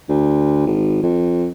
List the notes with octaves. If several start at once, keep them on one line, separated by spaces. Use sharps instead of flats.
D2
G#1
F2